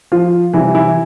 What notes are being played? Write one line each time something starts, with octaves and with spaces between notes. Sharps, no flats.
F3 F4
C3 E3 G3 E4
E3 E4